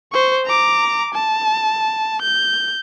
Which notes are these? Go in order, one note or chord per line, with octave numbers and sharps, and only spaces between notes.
C5 C#6
A#5 D6
A5
G6